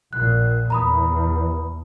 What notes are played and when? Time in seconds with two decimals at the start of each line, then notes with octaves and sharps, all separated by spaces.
0.13 A#1 A#2 F#6
0.70 E2 A#5 B5 D#6